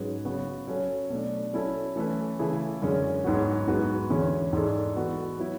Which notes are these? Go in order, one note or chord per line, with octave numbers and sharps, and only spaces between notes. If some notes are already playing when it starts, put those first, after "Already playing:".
Already playing: G#2 F#3 C#4 G#4 B4
C#3 F#3 B3 F#4 B4
F#3 C#4 F#4 A4
B2 A3 D4
F#3 C#4 E4 A4
E3 A3 C#4 E4 B4
C#3 E3 A3 E4 G#4
F#2 D3 G#3 C#4
G#2 F#3 B3 F#4
G#2 G#3 B3 F#4 B4
E2 D3 G#3 C#4 E4
G#2 G#3 D4 A4
E3 B3 F#4 A4
F#3 B3 E4